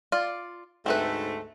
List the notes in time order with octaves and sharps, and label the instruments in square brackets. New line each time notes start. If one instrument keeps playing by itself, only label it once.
[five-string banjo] F4 D5
[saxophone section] D2 G#2 A3 [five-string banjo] C4 A4 B4